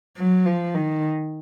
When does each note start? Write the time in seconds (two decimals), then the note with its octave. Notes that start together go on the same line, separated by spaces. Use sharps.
0.18 F#3
0.46 F3
0.75 D#3